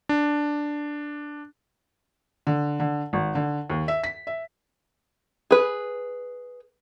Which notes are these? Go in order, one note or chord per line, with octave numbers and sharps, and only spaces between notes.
D4
D3
D3
G#1
D3
D#2
E5
B6
E5
G#4 B4